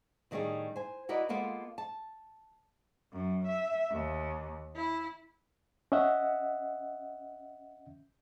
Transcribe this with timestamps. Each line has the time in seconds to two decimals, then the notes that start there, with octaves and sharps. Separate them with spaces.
0.31 A2 D#3 G3 C#4 D4 G#4
0.76 C5 G#5
1.09 E4 F#4 A#4 B4 D5 D#5
1.29 G#3 A#3 B3 F4 A4
1.78 A5
3.12 F#2
3.48 E5
3.90 D#2
4.76 E4
5.92 C#4 D#5 E5 F#5